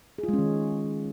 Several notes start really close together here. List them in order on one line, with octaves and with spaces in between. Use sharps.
G#4 F4 G#3 C#4 D#3